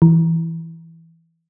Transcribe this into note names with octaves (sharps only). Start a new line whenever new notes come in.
E3